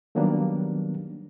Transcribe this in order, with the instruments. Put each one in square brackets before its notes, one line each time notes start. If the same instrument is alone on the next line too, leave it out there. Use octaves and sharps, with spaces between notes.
[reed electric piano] D#3 F#3 G3 A#3 B3 D4